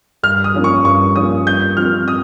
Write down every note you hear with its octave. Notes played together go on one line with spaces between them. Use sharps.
G2 F6
D#6
F3 A#3 C#4
C#6
G2 C#6
F3 A#3 C#4 D#6
G2 G6
F3 C4 F6
D#6